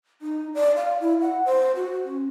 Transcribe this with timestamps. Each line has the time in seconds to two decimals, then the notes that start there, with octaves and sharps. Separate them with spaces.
0.22 D#4
0.54 D5
0.77 F5
1.01 E4
1.21 F#5
1.45 C5
1.76 F#4
2.05 C#4